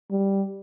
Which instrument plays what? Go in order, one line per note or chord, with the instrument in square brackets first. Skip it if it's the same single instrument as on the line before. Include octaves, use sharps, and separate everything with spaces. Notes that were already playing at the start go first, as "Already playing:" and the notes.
[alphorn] G3